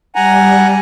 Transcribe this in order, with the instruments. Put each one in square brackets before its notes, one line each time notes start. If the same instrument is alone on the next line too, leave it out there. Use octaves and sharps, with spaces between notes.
[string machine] G3 [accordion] F#5 G#5 A#5